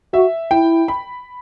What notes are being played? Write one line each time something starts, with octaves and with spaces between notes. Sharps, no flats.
F#4 E5
E4 G5
B5